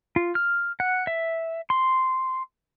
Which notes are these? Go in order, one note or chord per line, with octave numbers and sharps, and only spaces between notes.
F4
F6
F#5
E5
C6